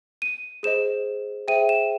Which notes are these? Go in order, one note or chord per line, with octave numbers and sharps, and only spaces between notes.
D#7
G#4 C5 D#5 E7
G#4 C5 E5 G5 D#7
E7